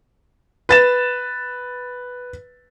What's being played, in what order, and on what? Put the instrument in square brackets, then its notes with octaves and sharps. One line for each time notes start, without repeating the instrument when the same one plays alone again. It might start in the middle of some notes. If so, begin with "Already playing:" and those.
[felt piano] B4 A6 E7